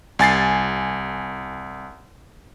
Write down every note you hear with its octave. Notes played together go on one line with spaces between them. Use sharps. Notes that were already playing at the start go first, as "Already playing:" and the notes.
C2 G#5 A6 C7